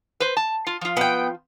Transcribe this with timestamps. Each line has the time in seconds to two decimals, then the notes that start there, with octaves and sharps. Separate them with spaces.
0.20 B4 C5
0.37 A5
0.67 F4
0.81 F3 F4
0.97 B3 G5